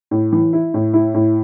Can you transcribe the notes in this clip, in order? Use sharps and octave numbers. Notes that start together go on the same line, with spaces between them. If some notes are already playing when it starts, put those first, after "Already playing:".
A2
E3
E4
A2
E4
A2